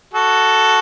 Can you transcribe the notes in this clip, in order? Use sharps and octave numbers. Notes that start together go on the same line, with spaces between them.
F#4 A4